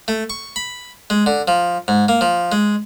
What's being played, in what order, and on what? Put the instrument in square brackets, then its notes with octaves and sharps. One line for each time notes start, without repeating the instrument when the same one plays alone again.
[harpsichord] A3
C#6
B5
G#3
D3
F3
G#2
A#3
F3
G#3